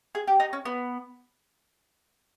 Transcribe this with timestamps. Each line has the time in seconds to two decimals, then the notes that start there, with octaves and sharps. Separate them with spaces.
0.15 G#4
0.27 G4
0.40 D#4
0.53 C#4
0.65 B3